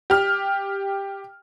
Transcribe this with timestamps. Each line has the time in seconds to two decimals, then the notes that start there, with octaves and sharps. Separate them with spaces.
0.10 G4 F6